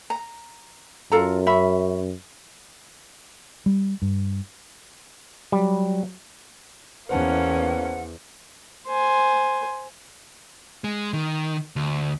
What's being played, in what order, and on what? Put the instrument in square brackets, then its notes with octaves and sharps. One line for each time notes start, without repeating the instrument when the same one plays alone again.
[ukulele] A#5
[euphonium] F#2 [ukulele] F4 A4 A#5
[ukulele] C#4 E5 B5
[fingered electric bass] G3
G2
[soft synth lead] F#3 [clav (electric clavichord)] G3
[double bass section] E2 [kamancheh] A#3 C#4 [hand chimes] B4 C5 A5 [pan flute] F#5
[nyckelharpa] C5 G#5
[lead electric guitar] G#3
D#3
D2